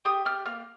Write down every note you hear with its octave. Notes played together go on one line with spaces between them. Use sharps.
G4 D#6
G4 F6
A#3 F6